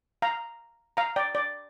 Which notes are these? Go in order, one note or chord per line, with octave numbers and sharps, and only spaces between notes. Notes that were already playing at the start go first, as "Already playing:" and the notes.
F5 A#5
F5 A#5
D5 G5
D5